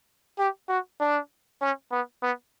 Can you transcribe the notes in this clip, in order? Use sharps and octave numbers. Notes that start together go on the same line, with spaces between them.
G4
F#4
D4
C#4
B3
B3